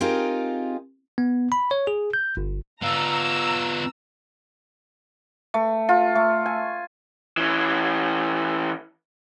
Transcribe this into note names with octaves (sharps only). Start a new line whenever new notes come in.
C4 D#4 F4 G4 G#4 A#4
B3
B5
C#5
G#4
G6
G1
B3 F4 A#5 E6
A3
F4
A3
G#5
E3 C#4